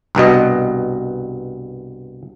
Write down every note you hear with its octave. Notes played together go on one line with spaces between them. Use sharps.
C2 G2 B2 D#5